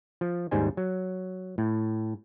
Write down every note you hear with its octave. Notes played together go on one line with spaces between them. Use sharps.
F3
D#2 G#2 G3 C5 G#5
F#3
A2